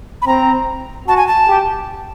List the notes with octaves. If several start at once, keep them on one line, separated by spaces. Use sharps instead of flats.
B5
C4 A#5
F#4 A5
G#5
A5
G4